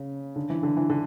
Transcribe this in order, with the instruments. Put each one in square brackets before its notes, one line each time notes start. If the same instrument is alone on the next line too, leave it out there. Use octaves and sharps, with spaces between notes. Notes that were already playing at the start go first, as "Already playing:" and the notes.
Already playing: [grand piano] C#3
D3
E3
D3
E3
D3